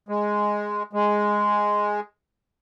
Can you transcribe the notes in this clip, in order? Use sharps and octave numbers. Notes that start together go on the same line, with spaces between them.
G#3
G#3